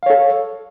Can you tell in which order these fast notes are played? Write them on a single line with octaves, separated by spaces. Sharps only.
F5 C#5 A4